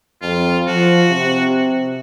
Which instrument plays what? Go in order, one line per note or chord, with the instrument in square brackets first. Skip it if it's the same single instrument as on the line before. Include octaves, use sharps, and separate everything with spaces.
[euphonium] F2 [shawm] F4
[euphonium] F3 [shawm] F#4
[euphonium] C3